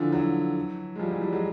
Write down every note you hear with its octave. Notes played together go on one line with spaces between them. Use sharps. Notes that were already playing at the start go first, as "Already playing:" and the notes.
Already playing: D3 E3 F3
E3 F#3
G#3
F3 G3
E3 F#3
F3 G3
F#3 G#3